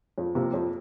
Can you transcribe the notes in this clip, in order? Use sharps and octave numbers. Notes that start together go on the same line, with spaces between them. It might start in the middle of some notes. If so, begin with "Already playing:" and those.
F2
C3 F3 A#3
F2